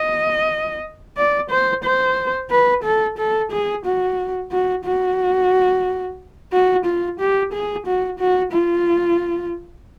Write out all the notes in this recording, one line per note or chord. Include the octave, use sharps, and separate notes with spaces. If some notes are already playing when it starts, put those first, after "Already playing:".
Already playing: D#5
D5
C5
C5
B4
A4
A4
G#4
F#4
F#4
F#4
F#4
F4
G4
G#4
F#4
F#4
F4